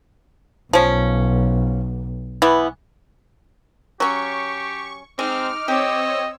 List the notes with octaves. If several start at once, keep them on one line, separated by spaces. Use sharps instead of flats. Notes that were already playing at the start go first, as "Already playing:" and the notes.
B1 F3 C#4
E3 B3
F#3 C#4 G4 C#6
G#3 C4 D#4 D6 F6
C4 G4 C#5 D#5 E6